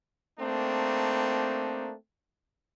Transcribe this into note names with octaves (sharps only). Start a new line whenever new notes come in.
A3 A#3 C4 D4 D#4